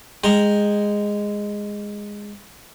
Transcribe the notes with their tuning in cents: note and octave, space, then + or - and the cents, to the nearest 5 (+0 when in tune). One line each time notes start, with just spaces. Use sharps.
G#3 -10 G5 +0 A#5 +0